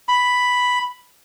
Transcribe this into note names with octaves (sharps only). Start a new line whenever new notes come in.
B5